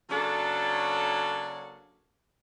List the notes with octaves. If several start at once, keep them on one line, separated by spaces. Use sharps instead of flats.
C#3 F#3 A#3 D4 F#4 A4